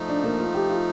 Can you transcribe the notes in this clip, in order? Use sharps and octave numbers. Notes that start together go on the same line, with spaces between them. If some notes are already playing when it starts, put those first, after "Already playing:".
Already playing: F3 A3 D#4
D4
A#3
F4
G4
F4